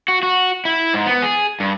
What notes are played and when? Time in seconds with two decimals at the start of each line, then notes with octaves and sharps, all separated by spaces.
0.08 F#4
0.23 F#4
0.65 E4
0.94 G#2
1.06 B3
1.22 G#4
1.60 G2